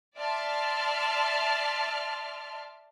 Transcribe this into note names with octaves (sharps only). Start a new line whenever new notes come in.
D5 E5 A5 C6 F6